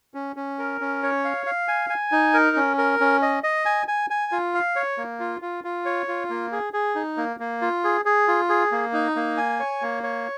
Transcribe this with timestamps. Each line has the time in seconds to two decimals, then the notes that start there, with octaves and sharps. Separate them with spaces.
0.14 C#4
0.36 C#4
0.59 A#4
0.81 C#4
1.03 C#5
1.24 F5
1.46 F5
1.68 G#5
1.90 G#5
2.12 D#4
2.34 A#4
2.56 C#4
2.78 A#4
3.00 C#4
3.22 D#5
3.43 D#5
3.65 G#5
3.88 G#5
4.10 G#5
4.32 F4
4.54 F5
4.76 C#5
4.98 A#3
5.20 F4
5.42 F4
5.64 F4
5.85 C#5
6.08 F4
6.30 A#3
6.52 G#4
6.73 G#4
6.95 D#4
7.17 A#3
7.40 A#3
7.61 F4
7.84 G#4
8.05 G#4
8.28 F4
8.50 G#4
8.72 A#3
8.93 D#4
9.16 A#3
9.37 G#5
9.60 C#5
9.82 A#3
10.03 C#5